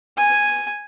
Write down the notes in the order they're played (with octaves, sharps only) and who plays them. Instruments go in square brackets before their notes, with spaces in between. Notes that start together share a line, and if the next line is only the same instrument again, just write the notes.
[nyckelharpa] G#5